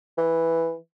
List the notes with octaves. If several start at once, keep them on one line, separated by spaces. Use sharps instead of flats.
E3